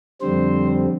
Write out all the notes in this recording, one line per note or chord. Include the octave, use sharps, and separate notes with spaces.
F2 D3 G3 C4 C5